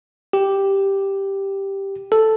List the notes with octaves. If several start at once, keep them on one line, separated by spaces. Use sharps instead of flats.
G4
A4